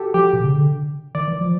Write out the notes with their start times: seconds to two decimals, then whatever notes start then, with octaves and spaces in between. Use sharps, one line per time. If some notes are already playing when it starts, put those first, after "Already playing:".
Already playing: F#4 G4 A4
0.14 F3 G4
0.33 B2
0.44 C#3
0.54 D3
1.15 D#3 D5
1.28 E3
1.41 F3